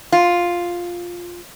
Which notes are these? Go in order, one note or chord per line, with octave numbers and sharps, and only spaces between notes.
F4